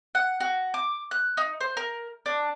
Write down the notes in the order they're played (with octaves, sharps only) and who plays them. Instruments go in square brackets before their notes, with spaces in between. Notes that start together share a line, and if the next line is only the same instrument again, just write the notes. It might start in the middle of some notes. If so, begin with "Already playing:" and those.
[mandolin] F#5
F#4
D6
F#6
D#4
C5
A#4
D4